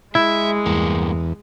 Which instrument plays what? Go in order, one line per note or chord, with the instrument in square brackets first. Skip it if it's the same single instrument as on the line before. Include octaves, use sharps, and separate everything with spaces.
[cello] G#3 [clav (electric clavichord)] E4 [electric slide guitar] E5
[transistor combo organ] E2 [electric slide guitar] G2 A#3